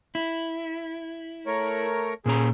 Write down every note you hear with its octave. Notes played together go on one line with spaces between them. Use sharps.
E4
A3 A#4 C#5
A#2 C#4 G#4 A#5